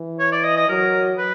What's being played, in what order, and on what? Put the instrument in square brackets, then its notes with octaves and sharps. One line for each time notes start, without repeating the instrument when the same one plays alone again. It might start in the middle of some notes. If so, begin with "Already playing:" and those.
Already playing: [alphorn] E3
[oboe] C#5
D5
D#5
D#5
[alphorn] F#3 [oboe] A#4
[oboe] B4